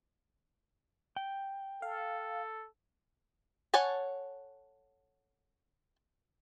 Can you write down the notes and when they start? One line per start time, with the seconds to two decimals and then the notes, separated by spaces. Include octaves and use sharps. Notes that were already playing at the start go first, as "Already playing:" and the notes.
1.16 G5
1.82 A4 F5
3.74 A4 C#5 F#5 G#5 A5